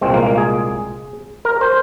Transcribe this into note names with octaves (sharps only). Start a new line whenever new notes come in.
C2 A#2 G#3 C4
A#3
A#3
G#4
A#4
C5